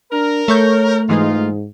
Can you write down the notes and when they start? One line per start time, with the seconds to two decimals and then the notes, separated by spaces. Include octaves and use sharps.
0.12 D4 A#4
0.48 A3 A4 C#5 C#6 G6
1.09 G#2 E3 G#3 D#4 F4 G#4